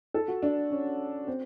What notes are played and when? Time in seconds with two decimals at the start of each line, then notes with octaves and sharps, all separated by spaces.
0.14 A4
0.28 F#4
0.42 D4
0.71 C#4
1.27 C4